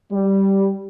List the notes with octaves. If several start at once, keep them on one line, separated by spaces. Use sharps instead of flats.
G3